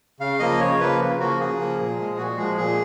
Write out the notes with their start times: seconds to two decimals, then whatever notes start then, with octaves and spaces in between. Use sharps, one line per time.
0.20 C#3 F5
0.40 F3 A#3 D#5
0.60 C#3 C#5
0.79 F3 A#3 B4
0.99 C#3
1.19 F3 A#3 F#4
1.39 C#3 G#4
1.59 F3 A#3
1.78 A#2
1.98 F3 G#3
2.18 A#2 F#4
2.37 F3 G#3 G#4
2.57 A#2 G#4